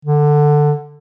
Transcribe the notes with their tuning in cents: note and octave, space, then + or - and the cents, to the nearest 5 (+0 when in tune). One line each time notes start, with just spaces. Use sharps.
D3 +10